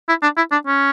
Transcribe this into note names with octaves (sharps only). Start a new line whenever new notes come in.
E4
D4
E4
D4
C#4